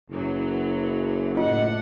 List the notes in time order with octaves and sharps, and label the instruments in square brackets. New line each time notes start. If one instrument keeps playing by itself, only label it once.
[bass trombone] F#1 [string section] F#2 E3 F#3
[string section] A2 D4 F#5 [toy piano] F4 [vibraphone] D#5